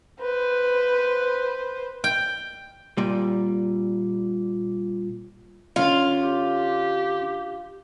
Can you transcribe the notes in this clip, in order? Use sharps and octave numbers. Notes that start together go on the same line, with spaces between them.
B4 C5
G5
A#2 G3
D3 C#4 F4
G4